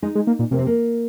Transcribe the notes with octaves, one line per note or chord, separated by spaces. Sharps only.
G#3 D#4
G#3
A#3
A#2
C3 A#3
C4
A#3